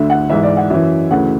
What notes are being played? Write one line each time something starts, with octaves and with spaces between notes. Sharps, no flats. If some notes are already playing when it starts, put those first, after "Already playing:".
Already playing: D2 D3 E5
F#5
G#2 E3 E5
D5
F#5
F#2 E3 E5
D2 C#3 E3 F#5